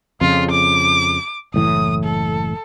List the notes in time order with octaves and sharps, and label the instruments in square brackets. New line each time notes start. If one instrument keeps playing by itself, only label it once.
[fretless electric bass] F2 C#3 [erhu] F4
[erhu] D6
[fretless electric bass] F#1 A2 E3 [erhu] D#6
[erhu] A4